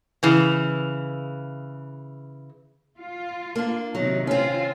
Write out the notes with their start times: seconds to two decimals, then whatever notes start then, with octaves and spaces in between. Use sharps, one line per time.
0.23 C#3 E3
2.97 F4
3.56 A#3 D4
3.95 C3 D#3 F#3 D#4
4.27 C4 C#4 F4